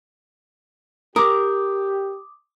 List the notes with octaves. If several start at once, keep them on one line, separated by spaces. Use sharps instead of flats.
G4 A#4 D6 D#6